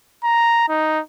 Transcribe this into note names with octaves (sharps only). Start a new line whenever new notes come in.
A#5
D#4